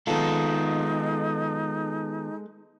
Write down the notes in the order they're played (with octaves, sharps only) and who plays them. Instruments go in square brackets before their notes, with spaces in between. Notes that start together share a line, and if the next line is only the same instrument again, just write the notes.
[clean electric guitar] D#3 B3 F4 [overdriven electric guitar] G#3 A4 [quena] D#4